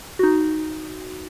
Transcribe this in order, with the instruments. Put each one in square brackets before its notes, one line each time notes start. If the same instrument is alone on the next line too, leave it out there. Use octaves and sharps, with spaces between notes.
[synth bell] D#4 F#4